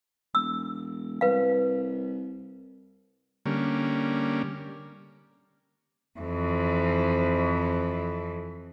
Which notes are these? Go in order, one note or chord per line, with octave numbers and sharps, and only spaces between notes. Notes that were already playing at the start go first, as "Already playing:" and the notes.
E1 E6
C2 B4 F5
D3 G3 A#3 C#4
F2 E3